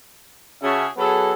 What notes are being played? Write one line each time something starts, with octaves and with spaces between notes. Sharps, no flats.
C#3 C#4 F#4 G#4 E5 A5
F#3 B3 G#4 A4